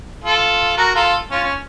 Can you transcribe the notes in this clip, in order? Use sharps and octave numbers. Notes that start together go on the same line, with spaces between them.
F4 A4
F#4 A#4
F4 A4
C#4 F4
C#4